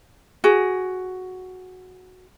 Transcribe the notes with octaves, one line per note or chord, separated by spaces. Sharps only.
F#4 G#4